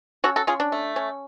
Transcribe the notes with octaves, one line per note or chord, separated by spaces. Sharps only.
C#4 F#4 A4
F#4 A4
C#4 F4 G#4
D4
A3
C#4